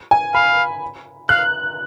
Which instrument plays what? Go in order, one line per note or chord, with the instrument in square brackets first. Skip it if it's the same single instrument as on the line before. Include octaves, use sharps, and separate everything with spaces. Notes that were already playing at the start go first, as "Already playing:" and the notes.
[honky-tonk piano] G#5
[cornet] F5 [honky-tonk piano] B5
[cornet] F5 [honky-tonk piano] F#6